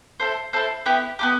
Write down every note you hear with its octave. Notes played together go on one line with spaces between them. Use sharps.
E4 A4 C5
E4 A4 C5
B3 E4 G4
B3 E4 G4